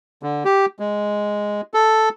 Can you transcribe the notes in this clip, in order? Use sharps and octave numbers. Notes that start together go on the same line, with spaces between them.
D3
G4
G#3
A4